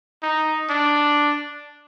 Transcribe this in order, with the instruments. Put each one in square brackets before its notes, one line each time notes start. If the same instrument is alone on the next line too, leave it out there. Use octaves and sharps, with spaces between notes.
[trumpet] D#4
D4